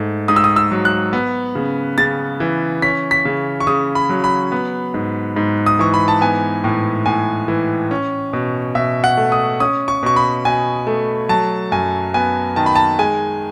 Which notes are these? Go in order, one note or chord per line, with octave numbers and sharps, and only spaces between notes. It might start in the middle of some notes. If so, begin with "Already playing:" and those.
Already playing: G#2 A3
G#2 D#6
E6
D#6
E6
F#3
F#6
B3
C#3
C#3 A6
E3
C#4 B6
B6
C#3
C#6
C#3 D#6
B5
F#3
B5
B3
G#2
G#2
D#6
E3 C#6
B5
A5
B3 G#5
A2
A2 G#5
E3
C#4
B2
B2 E5
F#5
A3
D#6
C#4 D#6
C#6
B2 C#6
B5
B2 G#5
A3
F#3 A5
F#2 G#5
B3 G#5
D#3 A5
B5
A5
G#3 G#5